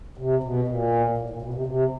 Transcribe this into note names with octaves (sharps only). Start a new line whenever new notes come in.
C3
B2
A#2
A2
A#2
B2
C3
C3